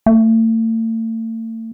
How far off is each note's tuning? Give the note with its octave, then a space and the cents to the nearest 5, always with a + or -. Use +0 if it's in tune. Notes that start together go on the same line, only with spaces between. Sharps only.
A3 +40